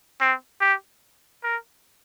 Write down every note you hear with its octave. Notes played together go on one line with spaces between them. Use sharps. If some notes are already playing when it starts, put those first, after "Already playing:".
C4
G4
A#4